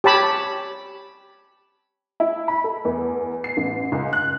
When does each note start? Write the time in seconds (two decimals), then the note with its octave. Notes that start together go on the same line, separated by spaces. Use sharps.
0.04 G4 C#5 A5 B5
2.20 E4
2.48 B5
2.64 A4
2.85 E2
3.44 C7
3.57 A1
3.92 C#2
4.13 F#6